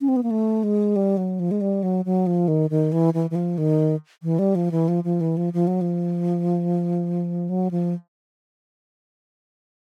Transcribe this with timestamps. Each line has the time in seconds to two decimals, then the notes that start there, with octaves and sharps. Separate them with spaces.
0.01 C#4
0.08 C4
0.16 B3
0.23 A#3
0.31 A3
0.63 G#3
0.96 G3
1.17 F#3
1.40 F3
1.51 G#3
1.61 G3
1.83 F#3
2.05 F#3
2.27 F3
2.48 D#3
2.70 D#3
2.92 E3
3.14 E3
3.30 E3
3.35 F3
3.58 D#3
4.23 E3
4.39 G3
4.55 F3
4.71 E3
4.88 F3
5.04 F3
5.21 E3
5.37 F3
5.53 F3
5.67 F#3
5.81 F3
7.49 F#3
7.71 F3